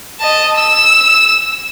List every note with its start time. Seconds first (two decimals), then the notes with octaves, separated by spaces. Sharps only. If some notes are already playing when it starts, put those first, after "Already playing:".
0.20 D#5 A5
0.57 E6